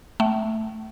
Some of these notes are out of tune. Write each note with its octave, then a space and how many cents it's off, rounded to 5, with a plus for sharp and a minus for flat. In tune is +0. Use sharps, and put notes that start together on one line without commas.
A3 +0 G5 -45